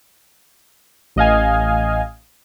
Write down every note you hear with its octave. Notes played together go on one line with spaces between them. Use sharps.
A1 D#5 F5 G#5